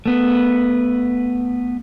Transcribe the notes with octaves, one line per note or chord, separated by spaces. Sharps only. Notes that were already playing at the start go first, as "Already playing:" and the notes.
A3 B3